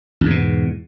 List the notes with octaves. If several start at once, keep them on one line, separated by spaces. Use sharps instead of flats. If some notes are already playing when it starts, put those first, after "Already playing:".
E2 G#2 B2